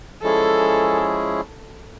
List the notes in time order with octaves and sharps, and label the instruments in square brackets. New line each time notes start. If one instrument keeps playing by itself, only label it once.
[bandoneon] F3 G#3 C#4 E4 G#4 [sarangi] A4